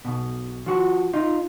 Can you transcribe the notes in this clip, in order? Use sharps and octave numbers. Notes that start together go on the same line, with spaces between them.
B1 B2
F3 F#4
D#4 F4